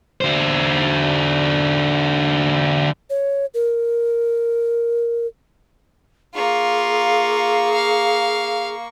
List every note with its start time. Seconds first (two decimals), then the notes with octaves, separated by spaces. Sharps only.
0.21 D3 C5
3.10 C#5
3.54 A#4
6.35 A#3 F4 G#4 C#6
7.74 F5